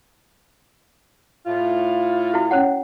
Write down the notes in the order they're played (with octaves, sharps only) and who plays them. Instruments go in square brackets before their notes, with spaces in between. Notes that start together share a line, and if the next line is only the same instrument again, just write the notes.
[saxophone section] A2 F4
[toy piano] E4 F#4
C#4 C#5 F#5